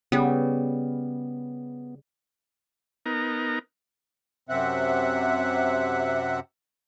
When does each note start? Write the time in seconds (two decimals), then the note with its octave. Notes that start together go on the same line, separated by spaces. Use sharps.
0.12 C#3 G3 B3
3.06 B3 D#4 A#4 A#5
4.49 F#2 C3 C4 E5 F#5